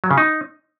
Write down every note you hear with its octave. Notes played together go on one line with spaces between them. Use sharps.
F#3
C#3
D#4